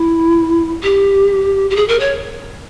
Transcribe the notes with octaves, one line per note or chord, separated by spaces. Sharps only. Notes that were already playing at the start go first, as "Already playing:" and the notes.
Already playing: E4
G4
G4
G#4
A#4
C#5